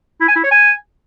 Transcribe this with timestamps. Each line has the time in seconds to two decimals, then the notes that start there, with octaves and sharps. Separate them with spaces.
0.21 E4
0.28 G#5
0.36 E4
0.44 C#5
0.51 G#5